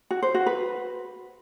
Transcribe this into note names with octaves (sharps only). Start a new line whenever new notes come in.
F#4
C5
F#4
B4